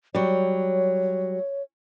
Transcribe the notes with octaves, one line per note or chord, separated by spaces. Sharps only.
F#3 G3 C#5